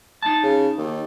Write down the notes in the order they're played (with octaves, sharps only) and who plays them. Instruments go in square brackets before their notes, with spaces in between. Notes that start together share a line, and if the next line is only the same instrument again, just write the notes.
[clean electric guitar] D#4 A5
[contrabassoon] C#3
D#2